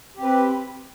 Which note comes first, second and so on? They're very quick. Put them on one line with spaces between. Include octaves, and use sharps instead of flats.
G4 C4 B4